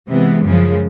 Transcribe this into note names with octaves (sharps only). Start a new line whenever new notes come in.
C3 E3 G#3 B3
F#2 C#3 F3 G#3